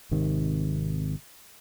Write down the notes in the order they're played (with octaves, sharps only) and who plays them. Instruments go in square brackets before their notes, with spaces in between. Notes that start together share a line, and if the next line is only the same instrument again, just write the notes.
[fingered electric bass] G#1 C3 D#3